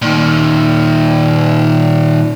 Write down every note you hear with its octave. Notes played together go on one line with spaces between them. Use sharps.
A#2 D#3